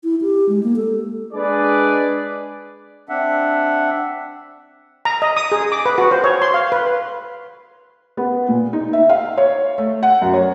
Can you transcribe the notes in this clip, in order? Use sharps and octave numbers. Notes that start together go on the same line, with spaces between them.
E4
G4
G#3
A#3
A4
G#3 D4 G#4 B4 D5
C4 D4 E5 F#5
A#5
D#5
D#6
G#4
D6
B4
F#4
C5
C#5
C6
F5
B4
B3
A#2
D#4
E5
F5
C#5
A3
F#5
F#2
C#5